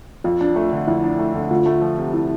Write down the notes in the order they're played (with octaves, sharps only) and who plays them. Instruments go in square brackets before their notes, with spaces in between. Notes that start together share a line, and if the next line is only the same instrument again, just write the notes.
[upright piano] F2 [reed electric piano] F4
[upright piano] D4
A3
D3
[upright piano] F2 [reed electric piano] E4
[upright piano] D4
A3
D3
[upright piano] D2 [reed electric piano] F4
[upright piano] A3
F3
C3
[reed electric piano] E4